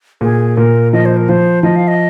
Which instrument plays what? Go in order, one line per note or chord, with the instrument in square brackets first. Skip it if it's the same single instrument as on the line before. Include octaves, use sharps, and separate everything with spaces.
[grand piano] A#2 [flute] G#4
[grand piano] A#2 [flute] A#4
[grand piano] F3 [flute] D#5
[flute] C5
A#4
[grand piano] F3 [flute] C5
[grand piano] F3 [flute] D#5
[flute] F5
D#5